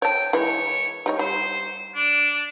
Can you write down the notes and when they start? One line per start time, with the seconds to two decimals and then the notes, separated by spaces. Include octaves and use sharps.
0.02 C#5 G5 A5
0.33 E3 G#3 C#5
1.06 G3 D#4 C#5
1.19 G3 C5
1.95 D4